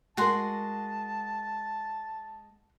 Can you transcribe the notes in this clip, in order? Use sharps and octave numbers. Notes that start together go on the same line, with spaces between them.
G#3 F#4 A#4 F#5 A5 C6